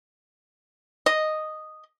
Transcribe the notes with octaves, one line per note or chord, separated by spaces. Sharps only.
D#5